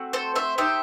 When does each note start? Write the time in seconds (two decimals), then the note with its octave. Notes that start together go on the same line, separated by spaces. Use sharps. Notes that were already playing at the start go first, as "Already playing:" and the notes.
Already playing: A3 C4 F#4
0.13 A4 C5
0.35 C5 E5
0.58 D#4 G4 C5 E5